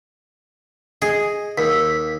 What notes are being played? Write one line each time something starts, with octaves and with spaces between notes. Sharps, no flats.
G#4 D#5
D#2 E6 B6